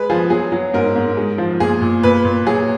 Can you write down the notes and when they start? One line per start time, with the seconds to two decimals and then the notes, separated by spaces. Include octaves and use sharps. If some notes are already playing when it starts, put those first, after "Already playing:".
Already playing: G#3 B4
0.10 F3 G#4
0.30 F#3 G#4
0.52 F#3
0.74 G#2 A#4
0.96 G#2
1.17 G#3
1.38 F3
1.60 A#2 G#4
1.82 A#2
2.03 A#2 B4
2.25 A#2
2.46 F#3 G#4